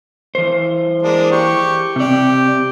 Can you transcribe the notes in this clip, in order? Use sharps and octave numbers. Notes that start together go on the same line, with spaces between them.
E3 C5
G#3 A#3 D4
G4 C#6
C3 G4 D5